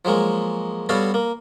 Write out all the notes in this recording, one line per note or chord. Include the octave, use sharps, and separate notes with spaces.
F3 F#3 G#3 A#3
G3 B3 F#4 A4 C#5 F5
A#3